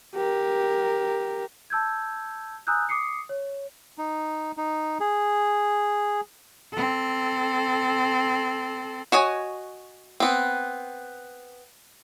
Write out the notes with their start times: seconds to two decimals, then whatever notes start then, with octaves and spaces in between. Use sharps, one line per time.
0.15 G4 A#4
1.70 A5 E6 G6 G#6
2.67 G#5 A#5 D#6 E6 F#6 G6
2.89 D6 D#6 C7 C#7
3.29 C#5
3.98 D#4
4.57 D#4
5.00 G#4
6.72 C4 A4
9.12 F#4 C#5 D#5 G#5
10.20 B3 C4